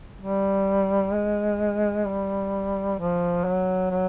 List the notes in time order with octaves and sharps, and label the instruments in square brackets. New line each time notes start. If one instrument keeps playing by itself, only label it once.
[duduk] G3
G#3
G3
F3
F#3
F#3